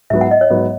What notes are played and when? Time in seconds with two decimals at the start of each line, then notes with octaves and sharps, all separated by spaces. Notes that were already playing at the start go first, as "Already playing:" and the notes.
0.10 G#2 F#3 B3 E5
0.21 F#5
0.31 D#5
0.41 C#5
0.50 G#2 F#3 B3